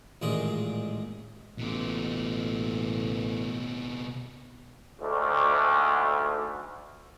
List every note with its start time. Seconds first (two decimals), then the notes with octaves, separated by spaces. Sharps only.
0.22 A1 A#2 D#3 G#3 G#4
1.58 A1 B2 A#3
5.00 D2 G#2